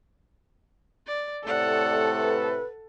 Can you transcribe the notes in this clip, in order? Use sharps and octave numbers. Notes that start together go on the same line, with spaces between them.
D5
A2 C3 A3 A4 D5 F#5
B4